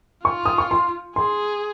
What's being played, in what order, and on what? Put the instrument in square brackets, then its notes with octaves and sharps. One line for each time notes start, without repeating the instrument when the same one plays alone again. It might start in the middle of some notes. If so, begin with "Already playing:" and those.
[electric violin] F4 [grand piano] C#6
[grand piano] D#6
C#6
C6
[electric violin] G#4 [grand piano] C6